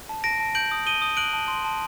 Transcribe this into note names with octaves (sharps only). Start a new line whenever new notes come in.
A5
A5 A#6 D7
A5
G6 D7 F#7
D#6
D#6 D#7 G7
D#6
F#6 D7 F#7
A5
C6
A5